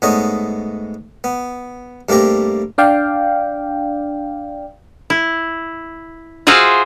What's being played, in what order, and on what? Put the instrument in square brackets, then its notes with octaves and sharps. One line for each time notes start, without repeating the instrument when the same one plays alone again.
[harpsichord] G#2 A3 B3 C#5 D#5
B3
G2 A3 A#3 C4 G4 A#5
[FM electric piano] D4 D5 F5 G5
[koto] E4
F4 F#4 G#4 C5 E5 F5